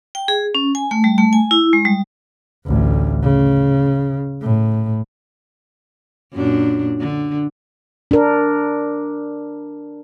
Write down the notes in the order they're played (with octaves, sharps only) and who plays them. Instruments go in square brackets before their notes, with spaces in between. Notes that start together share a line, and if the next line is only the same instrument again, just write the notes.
[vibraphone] G5
G#4
C#4
G#5
A3
G3
A3
G#5
E4
G#3
G3
[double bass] A1 D2
C#3
A2
[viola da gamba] F#2 A#2 D4
D3
[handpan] D4 A#4